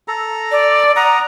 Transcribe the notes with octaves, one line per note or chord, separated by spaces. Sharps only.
A4 A#5
D5
F#5 A#5 D#6